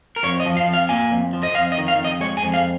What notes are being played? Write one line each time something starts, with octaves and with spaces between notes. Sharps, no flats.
A#4
F2 C#5
D#5
F3
F5
F2
F5
A#3 G#5
F2
F3
D#5
F2 F5
D#5
D#3
F5
F2
D#5
G#3 C#5
G#5
F2
F5